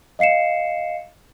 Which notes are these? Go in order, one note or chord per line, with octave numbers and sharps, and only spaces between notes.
D#5 F5 C7 C#7 E7